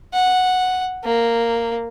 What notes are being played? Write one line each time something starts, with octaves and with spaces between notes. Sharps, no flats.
F#5
A#3